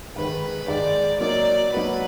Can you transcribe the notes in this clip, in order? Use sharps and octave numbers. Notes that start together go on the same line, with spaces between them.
G#2 D#3 G#3 B4
G#2 D#3 G#3 D5
F#3 A#3 D#4 F#4 A#4 D5
F#3 A#3 D#4 F#4 A#4 B4